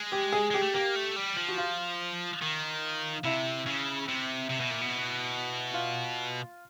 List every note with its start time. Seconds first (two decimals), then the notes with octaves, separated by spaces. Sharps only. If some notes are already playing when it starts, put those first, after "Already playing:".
Already playing: G#3
0.12 G4
0.32 G#4
0.50 G#3 G4
0.62 A3
0.74 A#3 G4
0.95 A3
1.16 G3
1.37 F3
1.48 F#4
1.58 F4
2.42 D#3
3.24 C3 E4
3.66 C#3
4.08 C3
4.50 C3
4.60 B2
4.71 A#2
4.81 B2
5.74 F4